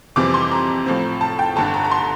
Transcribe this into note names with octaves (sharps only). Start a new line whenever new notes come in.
F2 C3 E3 G3 C4 D6
C6
A#5
A2 F3 C4
A5
G5
G1 G2 D3 A5
A#5
A#5
C6